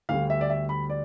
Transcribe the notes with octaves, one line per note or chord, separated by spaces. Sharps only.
D2 D3 G3 F5
E5
D5
E5
B5
D5